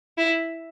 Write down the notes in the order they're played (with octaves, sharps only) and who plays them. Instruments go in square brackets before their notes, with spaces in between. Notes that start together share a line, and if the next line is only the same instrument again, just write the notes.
[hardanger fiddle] E4